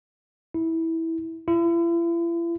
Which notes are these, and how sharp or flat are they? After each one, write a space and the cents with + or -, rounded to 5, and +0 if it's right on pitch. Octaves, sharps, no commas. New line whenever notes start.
E4 -15
E4 +40